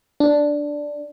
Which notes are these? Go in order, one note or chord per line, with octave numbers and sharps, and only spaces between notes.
D4